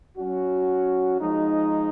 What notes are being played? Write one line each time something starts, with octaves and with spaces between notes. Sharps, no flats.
F#3 C#4 F#4
F3 G#3 D#4